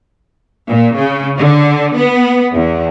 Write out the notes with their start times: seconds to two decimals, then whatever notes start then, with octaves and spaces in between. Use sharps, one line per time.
0.68 A#2
0.97 C#3
1.37 D3
1.96 B3
2.53 E2